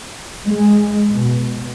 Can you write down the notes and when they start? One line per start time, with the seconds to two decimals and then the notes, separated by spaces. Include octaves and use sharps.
0.45 G#3
1.11 B2